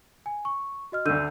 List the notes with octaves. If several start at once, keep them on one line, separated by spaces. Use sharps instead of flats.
G#5
C#6
F#4 D#5 F6
D2 D3 E6 G6 D#7